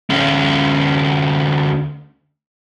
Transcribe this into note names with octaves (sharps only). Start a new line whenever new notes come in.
D2 C#4